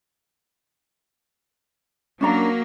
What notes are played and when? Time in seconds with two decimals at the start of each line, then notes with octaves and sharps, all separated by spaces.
2.21 F#3 A#3 C#4 D4 A#5